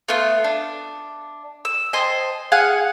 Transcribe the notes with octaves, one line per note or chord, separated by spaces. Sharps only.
A3 B3 F4
D4
E6
C5 D#5 G#5 A5
G#4 F5 F#5 G#5